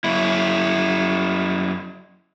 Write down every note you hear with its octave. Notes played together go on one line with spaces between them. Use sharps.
F#2 E4